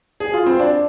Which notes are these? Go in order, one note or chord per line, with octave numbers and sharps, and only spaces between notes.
G#4
F4
C4
D4